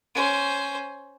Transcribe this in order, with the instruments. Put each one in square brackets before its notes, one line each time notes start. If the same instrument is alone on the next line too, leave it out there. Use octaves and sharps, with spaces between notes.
[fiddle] C#4 C5